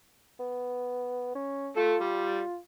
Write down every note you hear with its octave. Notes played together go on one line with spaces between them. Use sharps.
B3
C#4
A3 F4 A4
G3